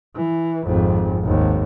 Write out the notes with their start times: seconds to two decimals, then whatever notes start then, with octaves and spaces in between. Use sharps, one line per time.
0.15 E3
0.66 G#1 F2
1.23 G#1 D#2